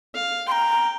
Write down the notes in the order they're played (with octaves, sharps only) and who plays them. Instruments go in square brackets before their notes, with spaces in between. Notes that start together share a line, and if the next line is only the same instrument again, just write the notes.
[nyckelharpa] F5
[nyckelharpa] G5 [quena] A#5 C6